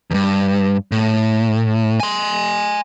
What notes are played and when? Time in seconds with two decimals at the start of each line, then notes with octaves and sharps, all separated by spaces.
0.11 E2 G2
0.92 A2
2.00 G#5 C6